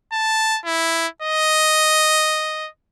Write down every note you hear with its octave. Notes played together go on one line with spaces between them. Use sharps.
A5
E4
D#5